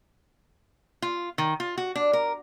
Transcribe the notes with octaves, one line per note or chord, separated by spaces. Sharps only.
F4
D#3
F4
F#4
D4
A#4